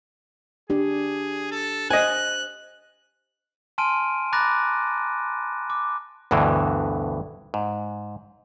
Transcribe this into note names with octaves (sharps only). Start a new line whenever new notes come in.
D4 G4 G#4
A4
C5 D#5 G#5 F#6
G#5 A5 C6 F6 D7 D#7
A#5 B5 D6 F#6 A6 A#6
D6
D2 G2 B2 D3 E3
G#2